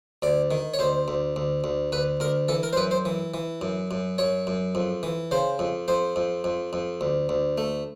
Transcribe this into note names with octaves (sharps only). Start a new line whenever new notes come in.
D2 D5
D#3
C#5
D2 C5
D2
D2
D2
D2 B4
D2 A#4
E3 A4
A#4
C5
F#2 B4
C5
E3
E3
F#2
F#2
F#2 C#5
F#2
F2
E3
C#3 C5
F2
F2 C5
F2
F2
F2
D2
D2
A3